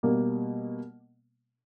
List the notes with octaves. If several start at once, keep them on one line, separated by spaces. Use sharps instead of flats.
B2 G3 A#3